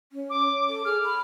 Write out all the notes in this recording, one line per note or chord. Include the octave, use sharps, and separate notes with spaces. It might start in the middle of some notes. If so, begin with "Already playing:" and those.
C#4
D6
A4
G#4 F6
B5